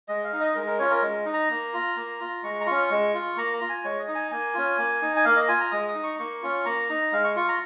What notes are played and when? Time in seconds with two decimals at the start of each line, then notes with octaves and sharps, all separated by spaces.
0.08 G#3 D#5
0.24 F5
0.33 D#4
0.40 D#5
0.55 G#3 A#4
0.67 A#4
0.79 C#4 F4 C#5
0.91 A#4
1.02 G#3
1.26 D#4
1.34 A#5
1.50 A#3
1.73 F4
1.96 A#3
2.20 F4
2.43 G#3 C#6
2.61 A#5
2.66 C#4 F4 C#6
2.91 G#3
3.14 F4
3.37 A#3 A#5
3.53 A#5
3.61 F4
3.69 G#5
3.84 G#3 C#5
3.99 D#5
4.08 D#4
4.15 G#5
4.31 A#3 G#5
4.54 C#4 F4
4.78 A#3
5.02 D#4
5.16 G#5
5.25 A#3 F5
5.37 D#5
5.48 F4 G#5
5.60 A#5
5.71 G#3 D#6
5.88 D#6
5.95 D#4
6.03 C#6
6.19 A#3 C#6
6.42 C#4 F4
6.65 A#3 A#5
6.89 D#4 A#5
7.12 G#3 F5
7.24 C#6
7.36 F4 C#6
7.49 A#5